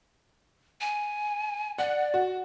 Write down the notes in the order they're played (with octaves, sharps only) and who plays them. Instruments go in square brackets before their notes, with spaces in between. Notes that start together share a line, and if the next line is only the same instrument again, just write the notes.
[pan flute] G#5
[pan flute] D5 [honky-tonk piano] F#5
[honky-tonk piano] F#4